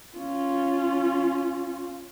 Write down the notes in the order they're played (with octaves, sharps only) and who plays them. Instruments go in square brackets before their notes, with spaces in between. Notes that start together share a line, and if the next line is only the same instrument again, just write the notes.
[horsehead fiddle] C#4 F4